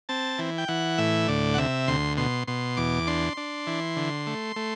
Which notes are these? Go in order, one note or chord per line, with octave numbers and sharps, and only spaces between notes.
C4 A5
E3
G5
E3 F#5
A2 E5
D2 D5
F#5
C3 E5
D2 C6
B2 C6
B2 C6
E2 D6
D4 C6
D4
E3
D3
A3
A3